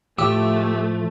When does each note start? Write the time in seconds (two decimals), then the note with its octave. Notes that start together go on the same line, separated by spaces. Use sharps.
0.19 A2 F3 A3 G4 D6 E6